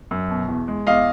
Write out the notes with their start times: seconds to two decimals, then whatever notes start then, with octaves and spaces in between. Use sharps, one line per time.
0.11 F#2
0.30 B2
0.49 E2
0.68 G#3
0.87 E2 D#5 F5